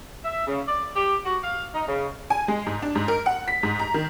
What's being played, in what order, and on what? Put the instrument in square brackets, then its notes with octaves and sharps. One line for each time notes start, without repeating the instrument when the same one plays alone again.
[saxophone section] E5
C#3
D5
G4
F#4
F5
D#4
C#3
[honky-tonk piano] G#5
G#3
G#2
D4
G#2
A#4
F#5
B6
G#2
A#5
D#3